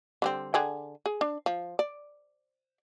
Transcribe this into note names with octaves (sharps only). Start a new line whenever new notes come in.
D3 G3 C4
D3 G#4 G5
G#4
D4
F3
D5